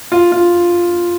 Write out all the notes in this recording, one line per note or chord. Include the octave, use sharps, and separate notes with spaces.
F4
F4